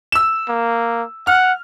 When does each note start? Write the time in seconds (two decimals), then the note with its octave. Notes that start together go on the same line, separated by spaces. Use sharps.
0.12 E6 E7
0.48 A#3
1.27 F#5 F6